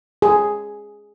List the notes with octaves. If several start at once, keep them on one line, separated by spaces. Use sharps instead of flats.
G#4